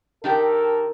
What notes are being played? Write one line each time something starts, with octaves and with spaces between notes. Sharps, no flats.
D#3 G4 A4 A#4 G5